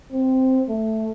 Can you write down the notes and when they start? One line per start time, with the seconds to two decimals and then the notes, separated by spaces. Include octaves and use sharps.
0.12 C4
0.69 A3